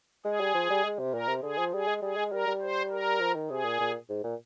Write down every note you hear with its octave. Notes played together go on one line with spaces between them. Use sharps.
G#3 G#4
G3
F3
G3
G#3
C3
A#2 A#4
C3
D3 G#4
F3
G3 G#4
G#3
G3 G#4
G#3
G3 A#4
G3
C5
A#4
F3
D#3
C3 G#4
A#2
A#2
G#2
A#2